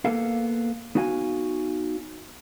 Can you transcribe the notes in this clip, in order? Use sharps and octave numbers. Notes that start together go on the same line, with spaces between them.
A#3 B3 A4 F5
B3 D#4 F#4 F5 G#5